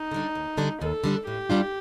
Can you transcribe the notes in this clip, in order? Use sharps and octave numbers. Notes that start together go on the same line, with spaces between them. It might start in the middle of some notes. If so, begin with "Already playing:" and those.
Already playing: D#4
D3 G3 D4
D#2
D3 G3 D4
D#2 A4
D3 G3 D4
A2 G4
G3 D4 F4